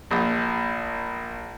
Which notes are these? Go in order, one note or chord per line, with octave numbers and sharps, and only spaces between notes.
A#1